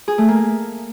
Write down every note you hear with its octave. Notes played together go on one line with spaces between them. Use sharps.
G#4
A3
A#3